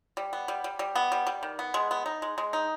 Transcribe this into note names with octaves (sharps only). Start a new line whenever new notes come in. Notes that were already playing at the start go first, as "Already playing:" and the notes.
G3
B3
G3
G3
G3
B3
G3
G3
D#3
B3
G#3
B3
D#4
G#3
G#3
D#4